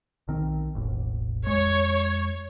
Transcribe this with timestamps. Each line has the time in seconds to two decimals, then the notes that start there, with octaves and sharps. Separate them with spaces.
0.28 B1 D#3 C4
0.75 E1 A1
1.46 F2 G#3 C#5